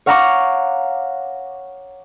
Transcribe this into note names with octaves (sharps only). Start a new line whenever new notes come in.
C#5 F5 F#5 A#5 C#6 D6